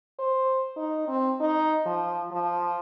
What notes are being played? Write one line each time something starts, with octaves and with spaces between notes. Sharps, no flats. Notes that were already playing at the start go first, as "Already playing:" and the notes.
C5
D#4
C4
D#4
F3
F3